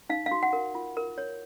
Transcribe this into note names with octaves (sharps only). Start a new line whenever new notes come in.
D#4 F5
F5
F#4
F#5
A#4
F4
A#4
C#5